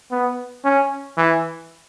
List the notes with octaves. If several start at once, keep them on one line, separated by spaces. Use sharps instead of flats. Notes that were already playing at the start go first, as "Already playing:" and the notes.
B3
C#4
E3